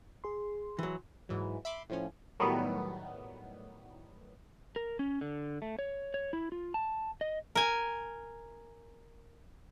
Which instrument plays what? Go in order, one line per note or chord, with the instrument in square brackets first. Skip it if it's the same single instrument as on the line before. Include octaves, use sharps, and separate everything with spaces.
[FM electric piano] G#4 C6
[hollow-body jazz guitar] E3 F#3
[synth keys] G#2 E3 F#3
E5 B5 C6 D6
A2 F3 C#4
[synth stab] A2 D#3 F#3 G3 B3
[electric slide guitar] A#4
C#4
D3
A3
C#5
C#5
E4
F4
A5
D#5
[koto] A#4 G#5